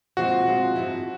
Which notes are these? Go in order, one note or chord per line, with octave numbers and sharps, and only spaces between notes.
A#2 F3 G#3 C4 F4 F#4
A#2 F3 G#3 C4 F4
G#2 F3 G#3 C4 E4